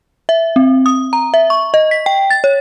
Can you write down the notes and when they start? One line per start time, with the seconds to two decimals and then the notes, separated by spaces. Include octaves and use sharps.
0.29 E5
0.56 C4
0.86 D#6
1.13 A#5
1.34 E5
1.50 C#6
1.74 D#5
1.91 B6
2.06 G5
2.30 A6
2.44 C#5